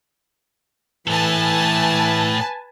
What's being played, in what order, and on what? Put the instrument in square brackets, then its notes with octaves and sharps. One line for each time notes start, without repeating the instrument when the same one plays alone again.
[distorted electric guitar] A2 A4 [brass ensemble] E3 [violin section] B4 G#5 A5